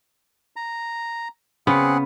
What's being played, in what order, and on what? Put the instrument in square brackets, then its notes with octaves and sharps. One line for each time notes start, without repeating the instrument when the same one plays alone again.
[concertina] A#5
[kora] C#3 B3 [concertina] C4 G#4 F#5